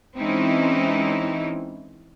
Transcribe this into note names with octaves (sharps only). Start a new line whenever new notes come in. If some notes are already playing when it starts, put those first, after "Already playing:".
E3 G#3 C4 C#4 D#4 E4